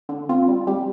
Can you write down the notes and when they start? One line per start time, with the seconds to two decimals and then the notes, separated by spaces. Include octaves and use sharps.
0.09 D3
0.29 C4 F4
0.48 G3
0.67 G3 G4